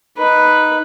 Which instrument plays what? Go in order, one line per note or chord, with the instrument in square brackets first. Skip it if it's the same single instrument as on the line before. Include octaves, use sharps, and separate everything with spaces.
[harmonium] D#4 [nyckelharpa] B4